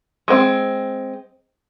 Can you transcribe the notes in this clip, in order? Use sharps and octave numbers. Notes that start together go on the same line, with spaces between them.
G#3 C4